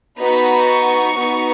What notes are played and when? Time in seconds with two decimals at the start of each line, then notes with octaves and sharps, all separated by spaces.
0.19 B3 D#4 F#4 B5
0.68 C#6
1.17 B3 D#4 F#4